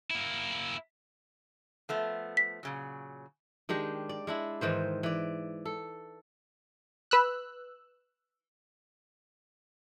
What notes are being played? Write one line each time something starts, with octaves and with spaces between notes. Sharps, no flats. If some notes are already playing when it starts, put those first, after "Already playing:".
A#3 E4
F3 A3 B3
B6
A#2 C#3 F#3
D#3 G#3 D4 G4
D5
G#3 D4 E4
G#2 D#3 E3 C5
E3 D5
A4
B4 E6 F#6